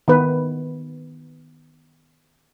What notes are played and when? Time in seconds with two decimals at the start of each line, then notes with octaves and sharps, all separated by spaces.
0.08 D#3 B3 B4